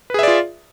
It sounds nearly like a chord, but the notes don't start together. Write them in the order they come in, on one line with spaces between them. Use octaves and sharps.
B4 G#4 E5 D5 F4